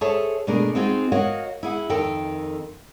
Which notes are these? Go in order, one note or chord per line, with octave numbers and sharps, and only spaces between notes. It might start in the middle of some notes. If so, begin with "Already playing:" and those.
G#4 A4 C5 C#5 E5 A5
B2 A3 D4 G#4 A#4
C4 D#4 F4 F#4 G#4
F#4 A#4 C#5 D#5 F5 F#5
E4 G#4 F#5
F2 D#3 A4 A#4 G5